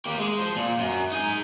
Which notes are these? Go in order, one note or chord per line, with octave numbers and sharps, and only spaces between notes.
A#3 G4
G#3
F3 C5
A#2
F#2
D#4 G#5